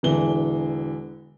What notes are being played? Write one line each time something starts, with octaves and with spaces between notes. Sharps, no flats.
E1 D3 E3 G7